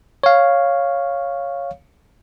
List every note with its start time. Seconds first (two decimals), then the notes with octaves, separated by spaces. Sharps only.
0.24 C#5 F5